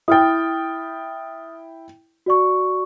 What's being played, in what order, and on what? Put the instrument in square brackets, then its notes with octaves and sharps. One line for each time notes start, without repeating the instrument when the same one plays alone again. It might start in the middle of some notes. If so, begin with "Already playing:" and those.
[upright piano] E4 G5 [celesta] D#6 F6 A6
[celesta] F#4 D5 C#6